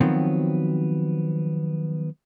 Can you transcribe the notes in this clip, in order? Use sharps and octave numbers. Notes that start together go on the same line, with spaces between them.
D#3 F3 F#3 B3 C4